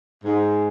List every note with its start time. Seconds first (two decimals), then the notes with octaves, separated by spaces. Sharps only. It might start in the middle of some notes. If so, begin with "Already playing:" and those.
0.24 G#2